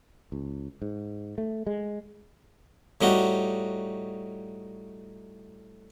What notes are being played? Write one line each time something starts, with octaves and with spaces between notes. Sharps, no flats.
C#2
G#2
A3
G#3
A2 G3 D#4 F#4